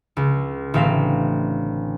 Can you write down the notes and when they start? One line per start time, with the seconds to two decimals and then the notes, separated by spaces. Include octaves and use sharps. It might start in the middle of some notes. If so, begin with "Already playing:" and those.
0.17 C#2
0.74 A1 D3 C4 F5 B6